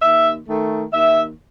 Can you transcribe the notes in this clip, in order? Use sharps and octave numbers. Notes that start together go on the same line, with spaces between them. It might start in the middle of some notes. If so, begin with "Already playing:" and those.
D#2 E5
D#3 A3
D#2 E5